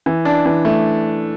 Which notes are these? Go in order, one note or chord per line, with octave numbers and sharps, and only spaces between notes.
E3
D4
E3
A3